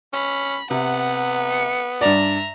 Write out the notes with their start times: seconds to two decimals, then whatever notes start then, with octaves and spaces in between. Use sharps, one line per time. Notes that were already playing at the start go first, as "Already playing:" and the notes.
0.13 C#4 B5
0.71 C3 B3 F#5
1.48 C#7
2.01 G2 D5 E5 A#5